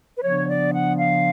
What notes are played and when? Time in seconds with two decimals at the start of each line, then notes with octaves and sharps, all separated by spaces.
0.17 B4
0.23 C#3 F3 B3 D4 C#5
0.49 D5
0.73 F#5
0.99 F5